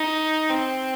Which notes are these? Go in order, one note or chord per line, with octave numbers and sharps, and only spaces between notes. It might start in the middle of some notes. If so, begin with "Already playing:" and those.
Already playing: D#4
C4